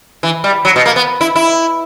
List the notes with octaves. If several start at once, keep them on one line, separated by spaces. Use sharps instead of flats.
E3
G3
F#3
B2
A#3
B3
E4
E4